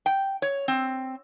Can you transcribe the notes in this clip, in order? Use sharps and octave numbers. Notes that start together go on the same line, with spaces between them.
G5
C#5
C4